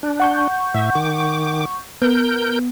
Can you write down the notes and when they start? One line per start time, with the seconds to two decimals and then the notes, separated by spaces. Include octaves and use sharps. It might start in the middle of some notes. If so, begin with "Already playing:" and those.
0.03 D4
0.20 F#5 C#6 G6
0.74 A2 E5
0.95 D#3 D6
2.02 B3 A#4 G6